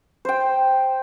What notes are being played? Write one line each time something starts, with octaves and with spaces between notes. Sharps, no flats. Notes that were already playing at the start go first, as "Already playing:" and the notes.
C5 G5